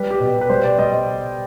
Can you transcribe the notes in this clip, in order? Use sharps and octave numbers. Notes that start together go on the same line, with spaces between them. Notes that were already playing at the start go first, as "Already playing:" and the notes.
Already playing: G3 B4
G4
B2
B4
G3 C5
D5
G3 D#5